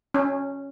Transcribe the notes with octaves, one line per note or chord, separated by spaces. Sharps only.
C#4